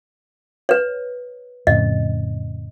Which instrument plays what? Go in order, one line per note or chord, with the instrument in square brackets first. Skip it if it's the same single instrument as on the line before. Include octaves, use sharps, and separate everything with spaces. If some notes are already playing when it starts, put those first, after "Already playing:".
[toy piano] B4 C#5
[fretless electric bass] F2 A2 C#3 [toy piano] D#5